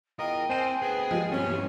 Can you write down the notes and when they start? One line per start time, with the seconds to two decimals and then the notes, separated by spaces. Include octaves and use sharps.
0.19 E2 F4 A#4 D#5 G5
0.50 C4 C5 G#5 D#7 F7
0.82 D2 B3 G#4 B4
1.11 F3 G3 G#3
1.32 G2 F3 C4 C#4
1.47 B2 E3 G3